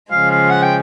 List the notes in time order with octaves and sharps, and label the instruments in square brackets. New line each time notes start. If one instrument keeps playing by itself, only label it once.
[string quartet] C#3 F3 G#3 [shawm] F5
[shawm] F5
F#5
G5